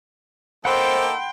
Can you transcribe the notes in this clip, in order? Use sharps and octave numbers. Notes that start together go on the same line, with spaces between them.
A#3 D#4 A4 C5 F#5 G5 B5 C6